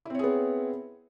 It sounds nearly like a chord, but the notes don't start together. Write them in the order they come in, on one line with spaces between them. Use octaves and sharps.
E4 C4 C#5 G#4 B3